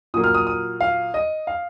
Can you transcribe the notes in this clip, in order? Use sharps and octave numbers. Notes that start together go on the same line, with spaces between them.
A#2 F#3 A#3 D#6
F6
D#6
D#6
F5
D#5
F5